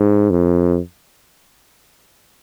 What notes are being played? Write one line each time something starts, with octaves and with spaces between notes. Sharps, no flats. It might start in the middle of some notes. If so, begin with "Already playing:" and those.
Already playing: G#2
F2